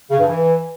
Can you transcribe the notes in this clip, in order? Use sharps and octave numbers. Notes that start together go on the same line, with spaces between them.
C#3
G2
E3